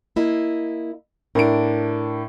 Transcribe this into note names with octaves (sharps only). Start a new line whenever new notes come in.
A#3 E4 D#5
A2 D4 A#4 D7